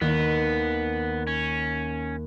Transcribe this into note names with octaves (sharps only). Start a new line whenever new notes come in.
D#2 B3
C#4